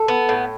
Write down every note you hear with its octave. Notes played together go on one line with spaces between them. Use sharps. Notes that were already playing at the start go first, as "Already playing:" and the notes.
Already playing: A4
B3
A2